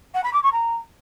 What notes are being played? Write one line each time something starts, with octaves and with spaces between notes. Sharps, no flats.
F#5
B5
D6
C#6
A#5